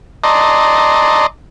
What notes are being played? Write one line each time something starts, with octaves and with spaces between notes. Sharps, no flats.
D5 D#5 A5 A#5 C6